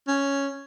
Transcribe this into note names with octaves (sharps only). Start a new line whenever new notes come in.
C#4